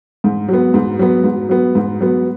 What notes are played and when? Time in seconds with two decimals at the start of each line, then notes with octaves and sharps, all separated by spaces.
0.24 G#2
0.48 F#3 B3
0.74 G#2
0.99 F#3 B3
1.24 G#2
1.49 F#3 B3
1.75 G#2
2.01 F#3 B3